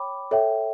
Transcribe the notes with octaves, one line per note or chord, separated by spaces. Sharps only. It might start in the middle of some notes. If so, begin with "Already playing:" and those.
Already playing: C#5 G5 B5 D6
A4 C#5 E5 G5